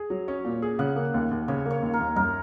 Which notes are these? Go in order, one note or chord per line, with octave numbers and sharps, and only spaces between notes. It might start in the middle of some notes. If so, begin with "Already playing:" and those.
Already playing: G#4
F#3
C#4
A#2
G#4
C#3 F#5
A#3
D#2
D#2
C#3 C#5
A#3
C#5
D#2
A#4
D#2
F#2 A#4